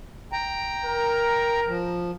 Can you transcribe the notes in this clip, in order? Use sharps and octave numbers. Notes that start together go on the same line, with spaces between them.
G5 A#5
A#4
F3